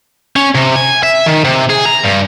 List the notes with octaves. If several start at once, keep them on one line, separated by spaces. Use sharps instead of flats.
C#4
C3
G#5
E5
D#3
C3
G#4
A#5
G2